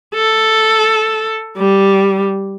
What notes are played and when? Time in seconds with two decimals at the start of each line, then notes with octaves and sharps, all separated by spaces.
0.15 A4
1.57 G3